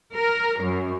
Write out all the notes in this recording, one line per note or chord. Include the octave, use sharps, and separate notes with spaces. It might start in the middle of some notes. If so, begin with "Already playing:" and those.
A#4
F#2